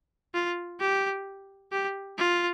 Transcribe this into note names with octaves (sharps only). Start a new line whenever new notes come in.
F4
G4
G4
F4